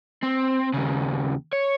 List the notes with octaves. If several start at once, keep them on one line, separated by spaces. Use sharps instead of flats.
C4
D#2 C#3
C#5